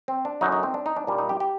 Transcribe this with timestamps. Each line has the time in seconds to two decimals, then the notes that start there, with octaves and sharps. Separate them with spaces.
0.08 C4
0.25 D4
0.41 F#2 D3 F#3 A#3 D#4
0.52 D#4
0.63 C4
0.74 D4
0.86 D#4
0.96 D4
1.07 A#2 G3 A#3 D4
1.18 D#4
1.29 G4
1.40 G4